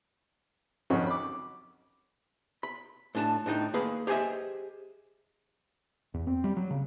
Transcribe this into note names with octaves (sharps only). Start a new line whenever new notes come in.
G#1 F2 F#3 C#4 F#4
B5 D6
B5
A2 D4 A5
A2 D4 D#4 G5
A#3 G#4 B4
G4 G#4 C5 D#5 E5
E2
C4
G3
F#3
C#3